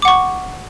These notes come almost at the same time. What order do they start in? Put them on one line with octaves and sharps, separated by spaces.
D6 F#5 C#6